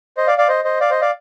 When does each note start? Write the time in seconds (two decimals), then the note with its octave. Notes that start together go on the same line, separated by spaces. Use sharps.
0.17 C5 D#5
0.27 D5 F5
0.38 D5 F5
0.48 C5 D#5
0.64 C5 D#5
0.80 D5 F5
0.90 C5 D#5
1.01 D5 F5